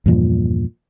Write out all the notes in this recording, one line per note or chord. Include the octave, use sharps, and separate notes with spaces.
E2 G2 A#2 F3